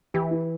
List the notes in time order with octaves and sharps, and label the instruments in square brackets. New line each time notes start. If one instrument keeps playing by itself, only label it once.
[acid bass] E3 [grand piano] G4
[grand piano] E4